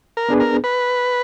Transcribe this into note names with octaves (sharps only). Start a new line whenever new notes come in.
A#4
B3 D4 G#4 B4
A#4
B4